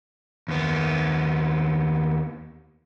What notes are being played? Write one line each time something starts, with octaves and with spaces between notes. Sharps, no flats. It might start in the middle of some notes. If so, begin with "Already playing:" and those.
D#2 B3